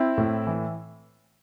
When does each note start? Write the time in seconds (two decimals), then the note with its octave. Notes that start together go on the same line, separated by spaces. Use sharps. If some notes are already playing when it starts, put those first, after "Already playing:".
Already playing: C4 E4
0.18 A2
0.47 E3